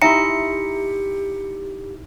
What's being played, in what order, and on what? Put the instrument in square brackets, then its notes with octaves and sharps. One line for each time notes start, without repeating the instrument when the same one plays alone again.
[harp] D#4 E4 C6 [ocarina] G4 [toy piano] E5 G#5 A#5 [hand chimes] C#7